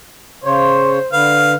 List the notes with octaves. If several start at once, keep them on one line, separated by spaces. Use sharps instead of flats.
C#3 C5 C#5
D3 B4 F5